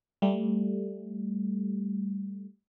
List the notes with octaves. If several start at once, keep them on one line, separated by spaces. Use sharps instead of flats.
G3 A3